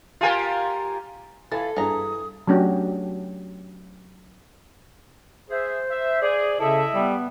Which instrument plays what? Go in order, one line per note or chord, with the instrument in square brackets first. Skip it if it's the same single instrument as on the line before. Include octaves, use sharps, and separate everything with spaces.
[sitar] F4 G4 A#4 [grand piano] F5 G#5
[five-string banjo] E3 [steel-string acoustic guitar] A4 [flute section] F5 B5 [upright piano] G#6 A6
[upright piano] G2 D4 G#4 [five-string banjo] E3 A#5 [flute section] D#6
[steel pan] F#3 A3 C#4 D4 F#4 G4
[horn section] G#4 E5 [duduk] C5
[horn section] E5
[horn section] G#4 [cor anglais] D5
[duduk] C#3 [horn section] E4 D#5 E5 [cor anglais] A4
[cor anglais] G3 [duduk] B3